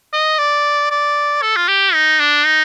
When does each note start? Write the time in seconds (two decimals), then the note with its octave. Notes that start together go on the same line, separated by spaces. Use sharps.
0.13 D#5
0.38 D5
0.90 D5
1.42 A4
1.56 F4
1.68 G4
1.94 D#4
2.20 D4
2.45 D#4